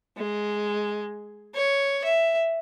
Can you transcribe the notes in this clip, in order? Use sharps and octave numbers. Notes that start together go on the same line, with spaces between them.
G#3
C#5
E5